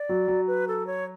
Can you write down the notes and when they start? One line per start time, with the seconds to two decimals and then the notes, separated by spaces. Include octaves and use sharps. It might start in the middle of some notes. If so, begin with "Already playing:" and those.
Already playing: D5
0.09 F#3
0.28 F#3
0.47 B4
0.68 A4
0.87 C#5